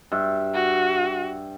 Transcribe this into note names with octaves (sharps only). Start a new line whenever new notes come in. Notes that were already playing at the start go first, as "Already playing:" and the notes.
G2 E5
F#4